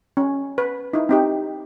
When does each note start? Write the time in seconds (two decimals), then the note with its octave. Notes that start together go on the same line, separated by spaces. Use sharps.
0.17 C#4
0.58 B4
0.93 D#4 E4
1.09 C4 D#4 G4